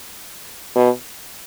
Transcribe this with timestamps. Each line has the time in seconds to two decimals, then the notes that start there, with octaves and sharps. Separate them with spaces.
0.76 B2